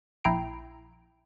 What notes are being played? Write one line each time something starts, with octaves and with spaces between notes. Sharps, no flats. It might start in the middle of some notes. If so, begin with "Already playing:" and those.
A#1 E4 G5 A#5 C7 D7